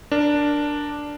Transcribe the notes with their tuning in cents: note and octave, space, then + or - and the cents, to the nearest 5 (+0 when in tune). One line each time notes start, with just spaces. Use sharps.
D4 +0 A#4 +0